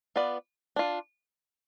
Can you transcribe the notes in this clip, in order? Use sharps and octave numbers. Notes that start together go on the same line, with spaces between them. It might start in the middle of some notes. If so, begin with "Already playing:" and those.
B3 F4 B4 D5
D4 F4